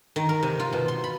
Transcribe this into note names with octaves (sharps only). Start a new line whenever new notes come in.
D#3
A#4
C3
F4
B2
C6
B5